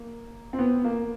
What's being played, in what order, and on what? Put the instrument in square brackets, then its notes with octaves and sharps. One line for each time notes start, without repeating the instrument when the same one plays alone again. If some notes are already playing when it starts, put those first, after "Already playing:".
Already playing: [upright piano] A#3
C4
B3
A#3